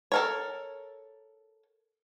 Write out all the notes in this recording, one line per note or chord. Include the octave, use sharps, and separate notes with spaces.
A4 A#4 C#5